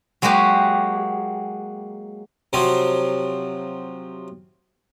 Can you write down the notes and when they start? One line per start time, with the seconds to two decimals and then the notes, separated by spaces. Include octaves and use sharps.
0.22 F#3 G#3 A#3 F#4 G4
2.53 C3 F3 F#3 C4